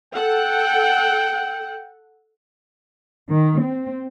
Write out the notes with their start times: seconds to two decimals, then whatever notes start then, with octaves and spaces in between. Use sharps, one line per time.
0.14 A4 F#5 G5
3.30 D#3
3.62 C4